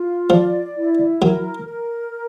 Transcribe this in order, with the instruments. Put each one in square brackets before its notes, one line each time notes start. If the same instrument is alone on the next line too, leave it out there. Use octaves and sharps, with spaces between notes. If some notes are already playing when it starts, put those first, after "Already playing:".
Already playing: [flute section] F4
[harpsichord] F3 [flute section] D5
[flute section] E4
[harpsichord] F#3 [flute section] A#4
[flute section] A#4